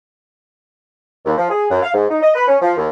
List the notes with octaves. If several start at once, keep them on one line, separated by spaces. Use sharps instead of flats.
D#2
F3
G#4
F#2
F5
G#2
D#4
D#5
B4
C#4
F3
D#2